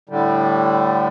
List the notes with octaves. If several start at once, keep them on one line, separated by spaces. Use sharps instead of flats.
A2 D3 G3